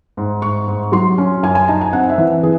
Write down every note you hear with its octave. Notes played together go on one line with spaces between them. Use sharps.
G#2
G#2 C#6
G#2
F#3 C6
C#4
F#2 G#5
G#5
D#4 A5
G#5
C4 F#5
E5
E3
E3 G#4